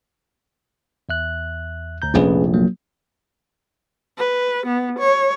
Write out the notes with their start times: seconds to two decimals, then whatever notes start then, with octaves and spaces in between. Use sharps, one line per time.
1.09 E2 E5 F#6
2.02 D2 A#5 G6
2.14 F1 A#1 F2 C#4 G#4 B4
2.54 F#3 A#3
4.18 B4
4.67 B3
4.99 C#5